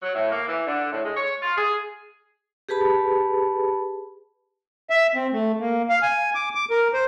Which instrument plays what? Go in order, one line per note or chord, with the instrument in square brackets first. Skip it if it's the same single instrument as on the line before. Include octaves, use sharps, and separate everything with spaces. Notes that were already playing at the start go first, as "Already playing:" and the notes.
[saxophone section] F#3
A2
A#3
E3
D3
A2
G#3
C#5
F4
G#4
[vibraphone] G4 G#4 B4 A5 B5
[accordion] E5
C4
A3
A#3
F5
G#5
D6
D6
A#4
C5